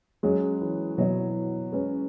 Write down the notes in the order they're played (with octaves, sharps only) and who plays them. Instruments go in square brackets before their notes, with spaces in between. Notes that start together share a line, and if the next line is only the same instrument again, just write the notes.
[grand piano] F#3 [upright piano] G#3 C#4 G#4
[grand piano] E3
[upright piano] B2 B3 E4 C#5 [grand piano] F#3
[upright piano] G#3 C#4 G#4 B4